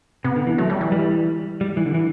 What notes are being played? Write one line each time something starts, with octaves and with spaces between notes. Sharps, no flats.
C3 B3
D3
E3
F#3 A3
G3
E3
G3
G3
E3
D3
E3